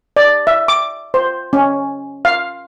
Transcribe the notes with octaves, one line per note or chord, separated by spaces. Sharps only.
D5
E5
D6
C5
C#4
F5